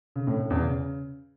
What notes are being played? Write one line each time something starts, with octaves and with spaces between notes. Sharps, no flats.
C#3
A2
A2
E2
C#3